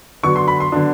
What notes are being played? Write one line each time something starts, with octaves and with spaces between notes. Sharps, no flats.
D3 F#3 B3 D4 C#6
C6
B5
C6
D3 F#3 B3 D4